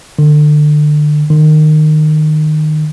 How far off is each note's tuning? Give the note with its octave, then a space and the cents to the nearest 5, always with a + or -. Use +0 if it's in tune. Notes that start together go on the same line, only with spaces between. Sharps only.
D3 +30
D#3 -20